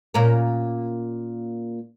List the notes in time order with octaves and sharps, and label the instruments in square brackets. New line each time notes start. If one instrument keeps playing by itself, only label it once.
[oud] A#2 C#4 A#4